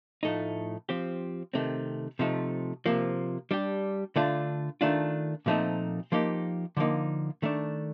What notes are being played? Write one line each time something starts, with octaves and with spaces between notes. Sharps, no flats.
A2 F3 A3 D#4
F3 C4 G4
C3 D#3 A3 C4
C3 F3 A3 D#4
C3 F3 A#3
G3 D4 G4
D3 A3 D4 F4
D#3 A3 D4 F4
A#2 F3 A3 C4 D#4
F3 A#3 D#4 G4
D3 F3 A#3 D#4
D#3 A3 D4